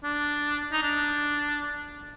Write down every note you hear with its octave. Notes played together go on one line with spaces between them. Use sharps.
D4
D#4
D4